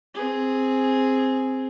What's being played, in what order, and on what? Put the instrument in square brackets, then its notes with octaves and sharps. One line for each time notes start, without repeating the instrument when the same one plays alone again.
[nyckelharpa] C4 G#4